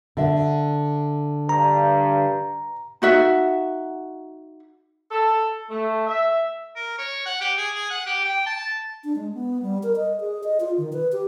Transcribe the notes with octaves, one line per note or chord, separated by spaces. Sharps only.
D3 E5
G2 A#5
D#4 F#4 E5
A4
A3
E5
A#4
C#5
F#5
G4
G#4
G#4
F#5
G4
G5
A5
D4
G#3
B3
G3
A#4
D#5
G#4
D#5
F4
D#3
B4
G4